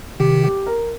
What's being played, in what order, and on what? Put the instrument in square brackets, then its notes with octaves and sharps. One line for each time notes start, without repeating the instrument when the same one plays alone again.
[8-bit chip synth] C3 D#3 [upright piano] G4
[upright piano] G4
A#4